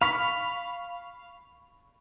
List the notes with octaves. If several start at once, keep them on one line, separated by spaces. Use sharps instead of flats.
F5 B5 C#6 B6